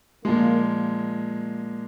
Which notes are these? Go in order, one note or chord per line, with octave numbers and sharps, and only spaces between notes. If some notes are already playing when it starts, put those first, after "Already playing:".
A#2 F3 G#3 A#3